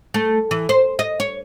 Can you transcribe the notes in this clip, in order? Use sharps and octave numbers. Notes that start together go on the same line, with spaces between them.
A3
E3
C5
D#5
C#5